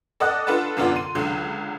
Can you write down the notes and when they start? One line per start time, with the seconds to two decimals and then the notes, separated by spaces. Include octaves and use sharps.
0.20 A4 D5 D#5 F#5 D#6 F#6
0.47 D4 F4 A4 B4 F#5 A5
0.77 F#2 D3 B3 F4 D5 F#5
0.96 C6 D#7
1.15 C#2 D3 F#3